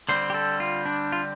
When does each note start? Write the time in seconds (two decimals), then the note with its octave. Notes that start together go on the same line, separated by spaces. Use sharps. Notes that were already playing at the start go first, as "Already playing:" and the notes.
0.09 D3 G3 C4 C5
0.30 G4
0.34 A4
0.60 F4
0.86 D4
1.12 F4